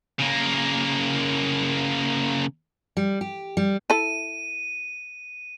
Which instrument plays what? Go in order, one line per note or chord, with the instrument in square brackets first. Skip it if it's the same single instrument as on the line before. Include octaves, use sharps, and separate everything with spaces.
[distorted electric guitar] C#3 A#3
[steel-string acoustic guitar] G3
G4
G3
[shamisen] E4 A4 [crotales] D#7